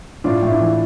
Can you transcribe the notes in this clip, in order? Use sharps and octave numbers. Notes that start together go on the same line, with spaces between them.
A2 D4 F4
A2 E4
D4
E3